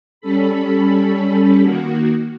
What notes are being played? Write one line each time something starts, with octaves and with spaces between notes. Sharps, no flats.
G3 C#4 A4 B5
D#3 A#3 F#4